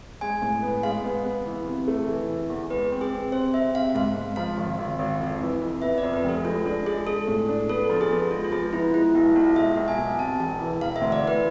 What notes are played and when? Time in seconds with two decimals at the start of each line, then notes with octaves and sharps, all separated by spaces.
0.21 G#3 G#5
0.42 A2
0.62 B3
0.83 G#3 F5
1.04 B3
1.25 B3
1.46 E3
1.66 C3
1.88 A3
2.08 E3
2.29 E3
2.50 E2
2.70 G#3 B4
2.92 C4
3.01 G#4
3.12 C4
3.32 C3 C5
3.54 C4 E5
3.75 C3 F5
3.95 G#2 F5
4.16 G#2
4.36 F3 F5
4.57 G#1
4.78 G#1
4.99 G#1
5.20 F2
5.40 E3
5.61 F2
5.82 B3 E5
5.98 D5
6.03 F2
6.13 B4
6.24 F1 A4
6.45 G#3 F4
6.65 D4 F4
6.86 G#3 G#4
7.07 G#3 A4
7.27 A2
7.49 D4
7.69 B3 A4
7.90 F3
8.01 G#4
8.11 B3
8.31 G#3 F4
8.44 F4
8.52 F3 G#4
8.73 B3 E4
8.93 G#3 E4
9.15 B1 E4
9.35 B1 F4
9.56 G#3 E5
9.77 B1
9.88 G#5
9.98 B1
10.19 C3 A5
10.39 E1
10.60 E3
10.81 E1 F5
10.96 E5
11.01 D2
11.12 D5
11.22 E3
11.27 B4